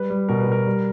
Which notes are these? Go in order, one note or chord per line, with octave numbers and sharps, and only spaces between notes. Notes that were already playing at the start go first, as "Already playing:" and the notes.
Already playing: G3 B4
G3
B2 A#4
B4
B2 A#4
G3